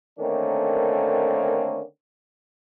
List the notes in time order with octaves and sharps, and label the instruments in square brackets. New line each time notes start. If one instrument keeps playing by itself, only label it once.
[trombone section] D3 D#3 A3 A#3 C4 C#4